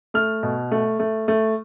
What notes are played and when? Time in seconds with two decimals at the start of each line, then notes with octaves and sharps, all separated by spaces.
0.14 A3 F6
0.43 B2
0.71 A3
0.99 A3
1.28 A3